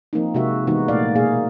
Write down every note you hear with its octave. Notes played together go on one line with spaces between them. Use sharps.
F3 A#3 C4 D#4
C3 G#3 F#4 E5
E3 G#3 B3 D#4 F#4
A#2 A3 A#3 D5 F5
B2 A#3 G#4 F5